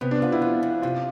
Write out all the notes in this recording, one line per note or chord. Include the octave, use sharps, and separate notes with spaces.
C3 B3
D4
B3 F4
E4
F3 F4
F2
C3 F4